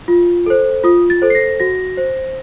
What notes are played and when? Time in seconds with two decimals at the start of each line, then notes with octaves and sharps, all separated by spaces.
0.08 F4
0.46 A4 C5
0.84 F4 D#6
1.10 A6
1.22 A4 C5
1.30 C7
1.35 A#6
1.60 F#4 A#6
1.97 C5